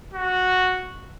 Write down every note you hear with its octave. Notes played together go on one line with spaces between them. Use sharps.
F#4